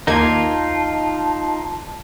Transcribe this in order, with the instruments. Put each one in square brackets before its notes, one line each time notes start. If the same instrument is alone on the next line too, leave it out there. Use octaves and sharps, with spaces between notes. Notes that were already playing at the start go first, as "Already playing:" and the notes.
[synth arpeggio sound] D#2 A#3 G#6 [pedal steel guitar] D#4 F4 [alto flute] A5